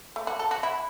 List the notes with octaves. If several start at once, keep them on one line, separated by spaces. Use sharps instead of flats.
A3
F#4
A4
F#4
E4